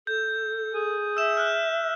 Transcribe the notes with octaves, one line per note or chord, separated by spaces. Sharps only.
A4 G6
G#4
E5 E6 E7
F6 F#6